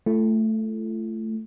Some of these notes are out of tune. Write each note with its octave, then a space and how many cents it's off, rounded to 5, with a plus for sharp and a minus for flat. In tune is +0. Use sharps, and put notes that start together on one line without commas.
A3 +0 F4 -40